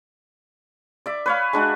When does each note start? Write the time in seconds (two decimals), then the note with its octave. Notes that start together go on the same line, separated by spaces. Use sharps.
1.06 D5 E5
1.26 B4 C#5 F5
1.53 G#3 D4 F#4